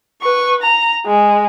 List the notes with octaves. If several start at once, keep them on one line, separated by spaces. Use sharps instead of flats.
B4 C#6
A#5
G#3